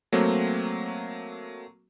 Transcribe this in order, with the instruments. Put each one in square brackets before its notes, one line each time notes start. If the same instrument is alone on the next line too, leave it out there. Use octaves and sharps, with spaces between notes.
[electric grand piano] F#3 A3 A#3 C4